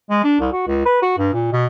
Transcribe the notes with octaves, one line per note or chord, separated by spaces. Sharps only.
G#3
D4
C2
F#4
C#2
B4
F#4
G2
A#2
B2